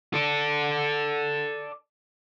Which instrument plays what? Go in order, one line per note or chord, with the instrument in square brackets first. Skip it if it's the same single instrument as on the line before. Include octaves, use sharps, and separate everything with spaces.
[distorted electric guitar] A4 D5